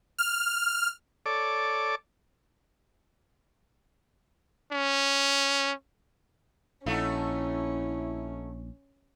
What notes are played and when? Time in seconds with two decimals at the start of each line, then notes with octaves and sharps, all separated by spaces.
0.19 F6
1.26 A4 C#5 D5 D6
4.72 C#4
6.86 A#1 A3 C#4 D#4 E4 F#4